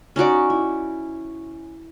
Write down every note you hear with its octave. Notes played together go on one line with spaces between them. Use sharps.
C#4 D#4 F#4 D5
E4